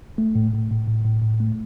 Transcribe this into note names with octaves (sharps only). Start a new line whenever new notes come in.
A3
A2
A2
A2
A2
A2
A2
A3